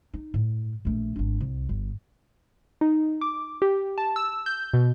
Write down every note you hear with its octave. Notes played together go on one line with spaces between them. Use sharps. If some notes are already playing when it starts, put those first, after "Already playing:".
D#4
A2
A#1 A3
G#1 D4
C2
G1
D#4
D6
G4
A5
E6
G6
B2